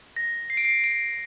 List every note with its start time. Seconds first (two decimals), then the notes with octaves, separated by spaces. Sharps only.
0.16 A#6
0.50 C7
0.57 D7
0.65 C7
0.84 D7